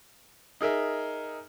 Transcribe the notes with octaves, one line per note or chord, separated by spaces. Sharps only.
D#4 G#4 A#4 E5